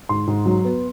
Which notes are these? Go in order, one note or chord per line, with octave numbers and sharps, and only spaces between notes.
G#2 C6
G#2
F#3
B3